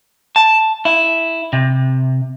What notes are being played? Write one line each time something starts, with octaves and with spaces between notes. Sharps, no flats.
A5
E4
C3